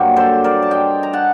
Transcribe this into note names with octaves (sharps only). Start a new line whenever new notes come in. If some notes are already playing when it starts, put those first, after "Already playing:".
Already playing: G2 F#3 A#3 G4
A4 C5
A#4 D5
A5
D#5 G5
A#5
F#5 A5